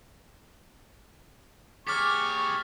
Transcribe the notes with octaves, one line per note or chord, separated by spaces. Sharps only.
G4 G#4 C#5 C#6 D6 F6 A6 B6